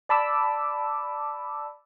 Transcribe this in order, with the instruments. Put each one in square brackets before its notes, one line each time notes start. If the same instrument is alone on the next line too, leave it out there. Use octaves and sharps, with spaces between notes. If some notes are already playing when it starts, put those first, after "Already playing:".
[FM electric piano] D5 A5 B5 D6 E6